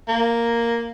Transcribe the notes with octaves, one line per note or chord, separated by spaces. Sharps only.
A#3